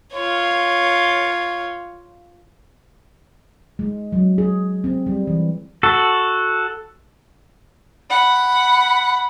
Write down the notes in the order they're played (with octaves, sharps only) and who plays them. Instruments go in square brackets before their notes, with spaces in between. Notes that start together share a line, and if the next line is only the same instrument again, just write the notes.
[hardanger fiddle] F4 C#5
[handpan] G#3
F#3
G#4
C4
G3
E3
[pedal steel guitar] F#4 A4
[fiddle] F#5 [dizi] B5